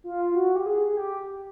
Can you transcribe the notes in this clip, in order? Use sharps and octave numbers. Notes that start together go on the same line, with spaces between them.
F4
F#4
G4
G#4
G#4
G4